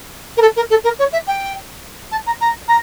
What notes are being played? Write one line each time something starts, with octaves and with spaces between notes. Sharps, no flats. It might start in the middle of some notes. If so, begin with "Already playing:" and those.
A#4
A4
A#4
A4
A#4
C#5
E5
G5
A5
A#5
A#5
A#5